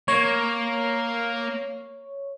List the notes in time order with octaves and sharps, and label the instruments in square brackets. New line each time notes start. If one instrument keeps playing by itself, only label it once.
[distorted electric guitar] A#3 [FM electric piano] C#5